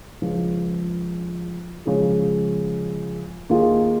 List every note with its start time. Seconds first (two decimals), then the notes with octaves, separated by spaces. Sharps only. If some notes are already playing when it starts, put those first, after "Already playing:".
0.22 C#2 C#3 F3
1.86 C#3 F3 G#3
3.50 D#2 D#3 A#3 F4 G#4